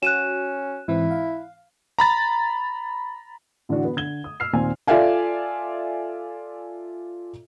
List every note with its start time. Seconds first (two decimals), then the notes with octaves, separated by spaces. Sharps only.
0.03 C#4 F#4 F#6 D#7 E7
0.88 G#2 E3 C4 E4
1.11 F5
1.99 A#5 B5 A6
3.69 A2 D3 E3 D4 F#4
3.85 B3
3.96 D3 G#6 G7
4.24 D#6
4.40 E6 F6 C7
4.53 D#2 A#2 C4 G#5
4.87 F4 A4 D5 E5 F5 G#5